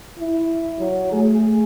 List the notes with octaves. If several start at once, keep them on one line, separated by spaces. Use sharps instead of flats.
E4
F#3
A3 G#4